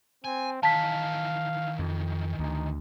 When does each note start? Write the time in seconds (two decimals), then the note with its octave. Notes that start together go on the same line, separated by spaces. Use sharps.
0.25 C4 G#5
0.63 D#3 E3 F5 A5 B6
1.79 F2
2.39 D2 D#4